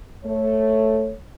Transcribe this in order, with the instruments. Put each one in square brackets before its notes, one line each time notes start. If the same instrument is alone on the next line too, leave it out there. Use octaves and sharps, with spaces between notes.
[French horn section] A3 C#5